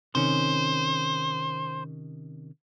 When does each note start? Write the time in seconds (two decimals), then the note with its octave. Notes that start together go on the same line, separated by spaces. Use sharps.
0.15 C3 D#3 C#4 C5